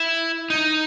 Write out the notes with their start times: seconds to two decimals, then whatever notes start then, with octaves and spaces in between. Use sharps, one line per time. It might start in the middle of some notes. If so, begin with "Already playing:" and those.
Already playing: E4
0.50 D#4